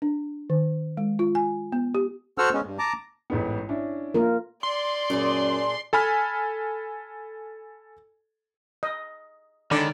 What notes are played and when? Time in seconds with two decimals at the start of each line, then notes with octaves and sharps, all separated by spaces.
0.02 D4
0.50 D#3
0.97 G#3
1.19 F4
1.35 G#5
1.72 B3
1.95 G4
2.38 F#4 A4 C5 F#5 E6 F6
2.54 G#3 B3 C#4
2.65 G2
2.79 A5 A#5 D6
3.30 A1 G#2 B3
3.69 C#4 D4 E4
4.14 A#3 F4 A#4
4.63 D5 C6
5.10 F#2 A#2 D4 G#4
5.93 A4 G#5 B5 F6
8.83 D#5
9.71 D3 D#3 G#3 C#5 D5 B5